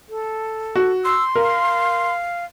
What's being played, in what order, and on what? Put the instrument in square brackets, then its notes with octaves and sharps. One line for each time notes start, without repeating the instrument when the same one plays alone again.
[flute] A4
[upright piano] F#4
[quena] C6 [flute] E6
[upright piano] A#4 [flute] F5